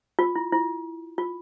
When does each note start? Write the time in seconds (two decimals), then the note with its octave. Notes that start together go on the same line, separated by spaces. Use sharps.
0.19 F4
0.36 E4
0.52 E4
1.18 F4